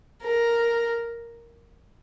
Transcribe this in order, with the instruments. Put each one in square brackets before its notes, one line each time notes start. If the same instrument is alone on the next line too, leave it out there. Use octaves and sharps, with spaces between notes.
[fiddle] A#4